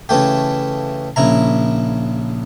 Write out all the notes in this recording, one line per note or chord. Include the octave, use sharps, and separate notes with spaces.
C#3 E3 A3 G4
A#1 C#3 E4 A#5